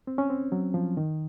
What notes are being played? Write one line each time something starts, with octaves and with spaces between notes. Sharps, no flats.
C4
C#4
C4
F#3
F3
D#3